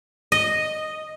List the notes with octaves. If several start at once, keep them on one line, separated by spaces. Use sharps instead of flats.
D#5